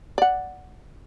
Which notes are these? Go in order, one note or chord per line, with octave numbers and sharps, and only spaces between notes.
D5 F#5